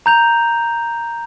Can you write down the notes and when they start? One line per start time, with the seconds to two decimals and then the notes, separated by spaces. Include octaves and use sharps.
0.06 A#5 G6 F7